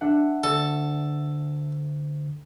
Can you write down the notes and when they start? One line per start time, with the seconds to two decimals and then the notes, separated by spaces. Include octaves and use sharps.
0.01 D4 E5 F#5
0.44 D2 A4